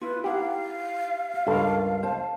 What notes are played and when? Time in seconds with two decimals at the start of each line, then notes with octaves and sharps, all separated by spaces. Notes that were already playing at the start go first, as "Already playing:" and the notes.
0.01 E4 F4 B4
0.24 D#4 E4 G4 F5 F#5
1.47 C#2 G2 A4 A#4
2.03 C5 A5